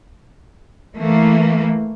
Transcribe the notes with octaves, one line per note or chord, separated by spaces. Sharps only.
E3 A3 A#3